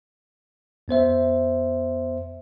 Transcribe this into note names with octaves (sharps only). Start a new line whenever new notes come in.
F2 B3 C5 E5